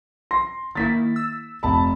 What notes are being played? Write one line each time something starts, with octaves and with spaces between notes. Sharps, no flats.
C6 A#6
D#3 A#3 E4 A6 B6
E6
F1 A5 B5